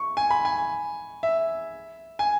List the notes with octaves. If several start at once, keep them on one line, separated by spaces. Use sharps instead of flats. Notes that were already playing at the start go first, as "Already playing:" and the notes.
Already playing: C#6
G#5
B5
G#5
E5
G#5